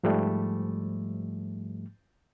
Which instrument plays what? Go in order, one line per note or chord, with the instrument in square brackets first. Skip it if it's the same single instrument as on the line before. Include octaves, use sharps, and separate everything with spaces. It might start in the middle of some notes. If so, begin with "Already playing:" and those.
[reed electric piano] G#2 F3 G3 A3